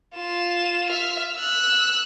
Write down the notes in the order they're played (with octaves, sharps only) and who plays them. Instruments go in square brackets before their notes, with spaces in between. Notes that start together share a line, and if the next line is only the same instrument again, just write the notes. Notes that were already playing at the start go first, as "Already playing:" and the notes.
[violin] F4 E7
E5 F6
E6 F#6